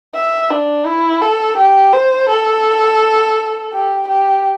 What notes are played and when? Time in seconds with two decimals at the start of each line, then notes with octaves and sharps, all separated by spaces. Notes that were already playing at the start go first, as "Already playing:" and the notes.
0.15 E5
0.50 D4
0.86 E4
1.21 A4
1.57 G4
1.93 C5
2.29 A4
3.73 G4
4.08 G4